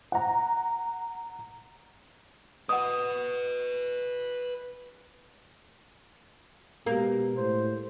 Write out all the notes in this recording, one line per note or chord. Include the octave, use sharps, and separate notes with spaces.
F#5 A#5
B4 D#5 F#5 D#6
B2 G#3 A#3 G4
A2 C5